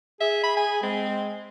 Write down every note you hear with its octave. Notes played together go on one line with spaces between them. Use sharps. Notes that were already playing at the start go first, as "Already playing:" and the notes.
G#4 E5
B5
G#5
G#3 C4